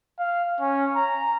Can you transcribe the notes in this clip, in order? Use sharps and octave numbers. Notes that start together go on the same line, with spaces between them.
F5
C#4
A#5